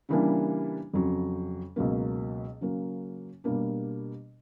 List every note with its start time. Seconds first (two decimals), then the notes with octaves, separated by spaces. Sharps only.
0.09 C#3 E3 G3 A#3 D4
0.94 F2 C#3 F#3
1.76 C#2 B2 F#3 A#3
2.61 C#3 F#3 A#3
3.44 B2 G3 A#3 D4